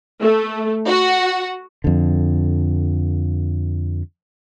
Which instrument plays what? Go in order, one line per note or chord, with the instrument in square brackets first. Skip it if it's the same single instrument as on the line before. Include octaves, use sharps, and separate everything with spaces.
[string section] A3
F#4
[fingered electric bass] F2 D3